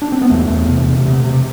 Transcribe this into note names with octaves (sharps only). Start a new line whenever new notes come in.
D4
C4
B3
E2 A3
E2
C3
C3
C3
C3